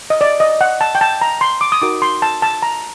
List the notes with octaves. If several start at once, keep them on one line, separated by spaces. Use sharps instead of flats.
D#5
D5
D#5
F#5
A5
G5
A5
A#5
C6
D6
D#6
D#4 F#4 A#4 D6
C6
A5
A5
A#5